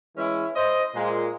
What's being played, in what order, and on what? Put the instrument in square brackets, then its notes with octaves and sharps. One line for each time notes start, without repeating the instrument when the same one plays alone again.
[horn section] E3 G#3 C#4 E4
C5 D#5
A#2 G#3